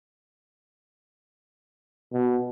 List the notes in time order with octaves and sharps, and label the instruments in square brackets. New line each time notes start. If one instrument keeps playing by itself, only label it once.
[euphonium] B2